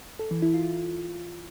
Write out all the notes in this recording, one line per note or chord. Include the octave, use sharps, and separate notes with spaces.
A4
E3
E4
F4